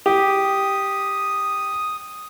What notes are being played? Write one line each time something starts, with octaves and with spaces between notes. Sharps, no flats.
G4 D#6